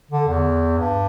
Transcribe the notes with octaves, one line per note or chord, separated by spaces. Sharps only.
D3
E2
G2